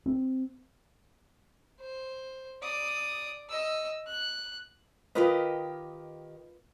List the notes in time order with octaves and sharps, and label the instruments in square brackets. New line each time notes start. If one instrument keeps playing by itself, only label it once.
[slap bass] C4
[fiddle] C5
D5 D#6
D#5 E6
F#6
[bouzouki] D#3 G4 D#5 [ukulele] F4 A#4 B4